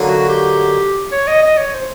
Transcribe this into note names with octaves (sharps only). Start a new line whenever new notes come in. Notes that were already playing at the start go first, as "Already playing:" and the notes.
Already playing: D3 F#3 A#3 D#4
F#4
G4
C#5
D#5
D#5
C#5
C5